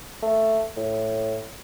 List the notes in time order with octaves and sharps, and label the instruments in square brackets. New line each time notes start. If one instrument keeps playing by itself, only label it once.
[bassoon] A3
A2